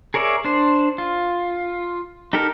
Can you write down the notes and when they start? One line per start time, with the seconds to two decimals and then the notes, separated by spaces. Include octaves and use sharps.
0.14 G#4 A#4 C#5 D5 E5
0.45 D4 C5
0.98 F4
2.33 D#4 G4 A4 A#4